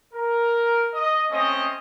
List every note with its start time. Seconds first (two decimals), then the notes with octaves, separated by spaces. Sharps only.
0.14 A#4
0.94 D#5
1.31 A3 C4 C#4 D#5